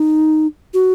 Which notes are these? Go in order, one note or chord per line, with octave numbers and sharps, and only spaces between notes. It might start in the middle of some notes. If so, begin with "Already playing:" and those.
Already playing: D#4
F#4